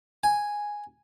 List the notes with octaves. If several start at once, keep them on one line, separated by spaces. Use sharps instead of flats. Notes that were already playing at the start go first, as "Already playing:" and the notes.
G#5